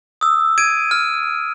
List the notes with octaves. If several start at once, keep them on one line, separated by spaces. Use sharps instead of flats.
D#6 E6
G#6 D7 D#7
F6